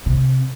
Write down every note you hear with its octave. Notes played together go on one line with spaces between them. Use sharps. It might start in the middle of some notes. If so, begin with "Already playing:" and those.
C3